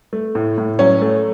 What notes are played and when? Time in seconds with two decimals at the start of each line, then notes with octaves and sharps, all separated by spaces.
0.13 A3
0.35 A2
0.58 A2
0.79 F#3 C#4
1.02 A3